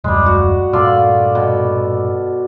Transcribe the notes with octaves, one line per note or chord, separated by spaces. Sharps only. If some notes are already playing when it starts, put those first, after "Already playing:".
D#1 F#2 G3 G#3
F#4
G2 A#2 F4 A4 D5
B2